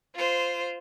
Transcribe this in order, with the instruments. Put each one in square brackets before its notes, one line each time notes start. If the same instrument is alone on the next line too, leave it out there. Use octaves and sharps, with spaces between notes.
[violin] F4 C5